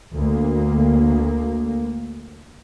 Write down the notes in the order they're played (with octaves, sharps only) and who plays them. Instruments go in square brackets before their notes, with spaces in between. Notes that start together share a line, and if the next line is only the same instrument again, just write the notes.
[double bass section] D2 A#3